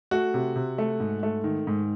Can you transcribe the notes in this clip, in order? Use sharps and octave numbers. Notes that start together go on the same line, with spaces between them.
A3 F#4
C3
C3
A3
G#2
A3
D#3
G#2